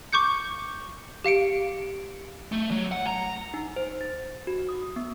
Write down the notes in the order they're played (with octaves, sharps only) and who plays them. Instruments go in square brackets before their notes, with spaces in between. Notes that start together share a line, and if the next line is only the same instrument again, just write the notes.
[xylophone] C#6 D6 G6 C#7
G4 F5 C#7 D7
[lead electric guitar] A3
F#3
F#5
A#5
[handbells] D#4
C5
A6
F#4
D#6
B3